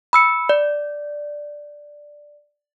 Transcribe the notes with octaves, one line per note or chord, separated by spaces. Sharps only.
B5 E6 C#7
D5